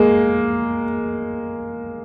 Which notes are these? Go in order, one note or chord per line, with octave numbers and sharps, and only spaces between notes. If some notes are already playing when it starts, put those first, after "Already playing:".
Already playing: G#3 A#3